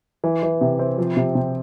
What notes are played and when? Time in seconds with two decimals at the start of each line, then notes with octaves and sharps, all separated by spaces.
0.24 E3
0.43 E3
0.61 C3
0.79 C4
0.98 F3
1.17 C3
1.35 C3